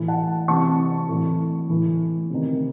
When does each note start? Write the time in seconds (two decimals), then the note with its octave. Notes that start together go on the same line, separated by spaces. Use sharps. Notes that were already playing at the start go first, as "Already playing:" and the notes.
Already playing: A2 E3
0.08 F#5 A5
0.48 C3 E3 A5 C#6
1.09 A2 E3
1.70 A2 E3
2.30 C3 D#3